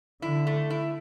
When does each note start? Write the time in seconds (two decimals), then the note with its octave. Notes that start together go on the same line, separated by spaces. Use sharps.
0.22 D3 E4
0.47 A3
0.70 E4